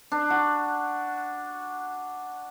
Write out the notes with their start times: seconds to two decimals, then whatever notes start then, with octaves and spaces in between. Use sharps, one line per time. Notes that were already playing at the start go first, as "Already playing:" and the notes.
0.12 D4
0.30 F#4